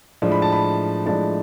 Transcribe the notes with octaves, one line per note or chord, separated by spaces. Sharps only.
A2 F3 G#3 D4
B5
A5
B5
A2 F3 G#3 D4 A5